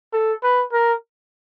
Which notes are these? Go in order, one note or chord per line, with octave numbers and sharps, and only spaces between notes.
A4
B4
A#4